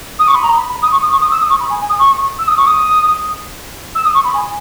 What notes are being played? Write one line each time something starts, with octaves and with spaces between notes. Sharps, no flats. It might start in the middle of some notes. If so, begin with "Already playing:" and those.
D#6
C#6
B5
A#5
B5
B5
D#6
C#6
D#6
C#6
D#6
E6
D#6
C#6
B5
G#5
G#5
D#6
C#6
E6
D#6
C#6
D#6
E6
D#6
C#6
B5
G#5